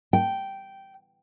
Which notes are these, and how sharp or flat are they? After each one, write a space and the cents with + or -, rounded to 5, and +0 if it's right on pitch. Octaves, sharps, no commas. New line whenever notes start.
G5 -10